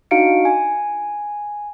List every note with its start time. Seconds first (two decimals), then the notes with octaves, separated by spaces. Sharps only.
0.11 D4 D#4 F#4 F5 C#7 D7
0.45 G#5